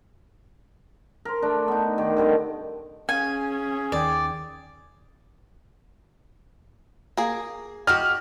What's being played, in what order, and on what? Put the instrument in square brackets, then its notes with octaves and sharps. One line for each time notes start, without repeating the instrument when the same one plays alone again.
[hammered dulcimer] A#4 C5
A3 D4
B3 D#4
D#3 G4
D3 D#3 G3 C4
[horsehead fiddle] C#4 [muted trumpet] G#4 [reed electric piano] F5 [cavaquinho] G#5
[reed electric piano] D#2 D#3 G5 [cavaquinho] D5
[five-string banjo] A#3 G#4
[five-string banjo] F#4 G4 D#5 [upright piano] F6